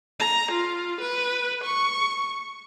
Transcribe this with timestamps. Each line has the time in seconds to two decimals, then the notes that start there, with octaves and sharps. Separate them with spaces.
0.19 A#5
0.52 F4
1.01 B4
1.64 C#6